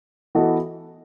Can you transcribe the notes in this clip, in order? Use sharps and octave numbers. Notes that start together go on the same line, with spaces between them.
E3 B3 F#4 A4 D#5